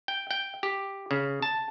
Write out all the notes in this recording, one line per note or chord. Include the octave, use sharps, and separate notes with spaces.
G5
G5
G4
C#3
A5